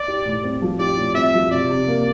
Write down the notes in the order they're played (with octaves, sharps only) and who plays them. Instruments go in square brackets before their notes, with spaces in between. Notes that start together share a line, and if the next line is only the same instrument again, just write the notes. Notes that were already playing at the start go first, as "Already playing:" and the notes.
Already playing: [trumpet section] D5
[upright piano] G4
A2
C4
F3
[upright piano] G4 [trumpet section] D5
[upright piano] A2
[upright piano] C4 [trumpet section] E5
[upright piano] F3
[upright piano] C3 [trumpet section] D5
[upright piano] C3
A#3